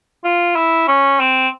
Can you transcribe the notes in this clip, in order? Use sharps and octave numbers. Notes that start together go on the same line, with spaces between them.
F4
E4
C#4
C4